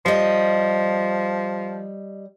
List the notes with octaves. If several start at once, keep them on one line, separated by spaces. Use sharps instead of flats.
F3 G3 D#5